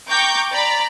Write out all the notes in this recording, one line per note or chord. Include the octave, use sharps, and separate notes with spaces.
G5 A#5 C#6 D6 G6
D5 A#5 B5